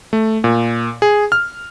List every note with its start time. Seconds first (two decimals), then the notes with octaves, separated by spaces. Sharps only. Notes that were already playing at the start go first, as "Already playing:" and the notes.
0.13 A3
0.44 A#2
1.02 G#4
1.32 F6